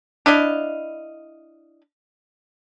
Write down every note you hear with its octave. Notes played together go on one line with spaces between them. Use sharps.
D4 E4 D#5 F5